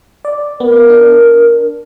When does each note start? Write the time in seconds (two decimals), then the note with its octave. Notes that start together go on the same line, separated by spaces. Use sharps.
0.25 D5
0.60 B3 A#4
0.90 D4